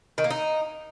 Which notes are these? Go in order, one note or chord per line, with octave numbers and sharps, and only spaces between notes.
D#3
A#3
D#4